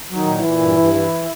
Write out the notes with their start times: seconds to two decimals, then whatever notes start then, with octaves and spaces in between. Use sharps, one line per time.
0.10 F#3
0.16 D#3 D#4
0.27 A#2
0.38 E3 E4
0.44 A#2
0.60 G2
0.77 G2
0.94 E3